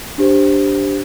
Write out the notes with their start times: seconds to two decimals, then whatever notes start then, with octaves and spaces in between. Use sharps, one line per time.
0.18 D4 G4 C5